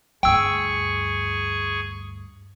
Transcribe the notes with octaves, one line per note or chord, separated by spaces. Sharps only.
D2 G2 G#4 G5 C#6 E6